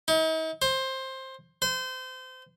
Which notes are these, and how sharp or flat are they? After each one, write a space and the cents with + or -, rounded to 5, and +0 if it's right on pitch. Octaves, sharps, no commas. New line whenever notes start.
D#4 +45
C5 +15
C5 -30